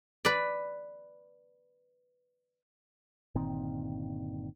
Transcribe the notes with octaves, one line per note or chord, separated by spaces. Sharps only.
B4 D5
G1 A#2 D#3 C4